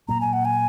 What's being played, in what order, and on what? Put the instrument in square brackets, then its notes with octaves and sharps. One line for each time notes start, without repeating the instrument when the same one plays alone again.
[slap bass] A#2 F#3 A#3 [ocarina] A#5
[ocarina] G#5
F#5
G#5